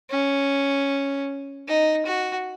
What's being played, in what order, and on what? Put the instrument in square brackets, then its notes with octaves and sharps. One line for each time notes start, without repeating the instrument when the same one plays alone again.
[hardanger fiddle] C#4
D#4
F#4